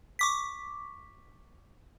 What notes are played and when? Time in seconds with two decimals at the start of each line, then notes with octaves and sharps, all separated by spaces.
0.19 C#6 D6 B6